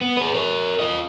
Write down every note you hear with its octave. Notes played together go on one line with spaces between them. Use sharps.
B3
G#4 B4
A#4 C#5
F4 D#5